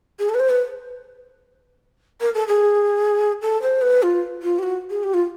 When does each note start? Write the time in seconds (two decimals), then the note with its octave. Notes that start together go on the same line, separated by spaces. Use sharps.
0.19 G#4
0.29 A4
0.34 B4
0.40 C5
0.49 B4
2.21 A#4
2.34 A4
2.48 G#4
3.42 A4
3.62 C5
3.82 B4
4.03 F4
4.42 F4
4.59 G4
4.63 F#4
4.90 G#4
5.03 G4
5.14 F4